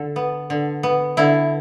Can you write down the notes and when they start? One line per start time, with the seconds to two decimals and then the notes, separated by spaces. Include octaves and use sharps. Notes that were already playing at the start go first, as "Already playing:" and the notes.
Already playing: D3 A4
0.16 B3
0.50 D3
0.83 B3
1.17 D3 E4